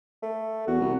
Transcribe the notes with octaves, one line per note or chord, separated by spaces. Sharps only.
A3
E2 F#4
C2